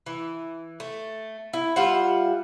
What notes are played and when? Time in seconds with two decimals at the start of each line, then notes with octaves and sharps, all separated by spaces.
0.06 E3
0.80 A3
1.53 E4
1.76 G3 F4 E5 F#5